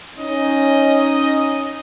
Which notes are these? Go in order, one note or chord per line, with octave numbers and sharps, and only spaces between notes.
C#4 D#4 D#5